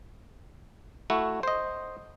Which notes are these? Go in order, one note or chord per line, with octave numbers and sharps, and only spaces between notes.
A3 E4 F#4
C5 D#5